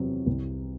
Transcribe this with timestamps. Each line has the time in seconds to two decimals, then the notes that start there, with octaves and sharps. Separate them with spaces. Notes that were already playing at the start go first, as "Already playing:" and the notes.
Already playing: E2 C3 F#3
0.26 C2